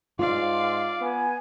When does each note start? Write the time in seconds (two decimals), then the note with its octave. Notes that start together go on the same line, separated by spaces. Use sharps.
0.19 G#2 F4 D5 F5 C6
1.01 B3 G#5